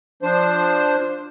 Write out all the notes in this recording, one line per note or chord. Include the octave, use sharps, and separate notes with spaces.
F3 D4 C5